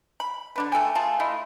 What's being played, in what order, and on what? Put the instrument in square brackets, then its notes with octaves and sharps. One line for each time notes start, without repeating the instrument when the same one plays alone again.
[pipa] B5
D3 D4 B4
A3 A4 G5 G#5
A3 F4 G#4 A5
A3 E4 F4 D#5